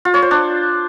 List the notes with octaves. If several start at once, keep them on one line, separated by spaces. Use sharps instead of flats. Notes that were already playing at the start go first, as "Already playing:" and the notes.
F4
C#5
C5
D4